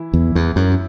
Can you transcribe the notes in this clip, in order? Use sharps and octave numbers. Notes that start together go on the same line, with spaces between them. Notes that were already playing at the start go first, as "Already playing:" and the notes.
Already playing: E3 E4
E2
E2
F#2